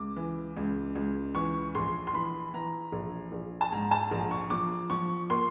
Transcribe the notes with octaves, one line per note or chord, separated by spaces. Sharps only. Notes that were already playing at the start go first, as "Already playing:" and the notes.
Already playing: C#2 D6
E3
C#2
C#2
E3 C#6
A#1 C6
C6
E3 B5
E3 A#5
A#1
A#1
A5
G#2 A#5
A5
A#1 A#5
C#6
F3 D6
F3 C#6
A#3 C6